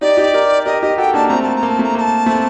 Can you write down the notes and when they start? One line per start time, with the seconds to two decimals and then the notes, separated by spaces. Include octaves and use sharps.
0.01 D#4 G4 D5
0.17 D#4 G4
0.33 G4 A#4
0.66 G4 A#4 D#5
0.82 D#4 G4 D#5
0.98 F#4 A4 G5
1.14 A#3 D4 A5
1.28 A3 C4 A#5
1.43 A#3 A5
1.56 A#5
1.63 A#3
1.70 A5
1.79 A3 A#5
1.95 A#3 A#5
2.01 A5
2.26 A3 C4